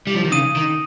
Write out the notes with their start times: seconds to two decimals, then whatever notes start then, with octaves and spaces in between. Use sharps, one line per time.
0.07 G3
0.15 F3
0.24 D#3
0.32 C#3 D#6 D#7
0.56 D#3